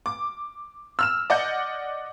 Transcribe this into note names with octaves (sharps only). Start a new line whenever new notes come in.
D6
E6 F6 E7
D5 D#5 F#5 G6